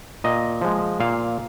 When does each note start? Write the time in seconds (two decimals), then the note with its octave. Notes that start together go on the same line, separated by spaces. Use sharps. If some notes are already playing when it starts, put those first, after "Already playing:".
0.24 A#2 D#5
0.61 F3 G#3
1.00 A#2 F5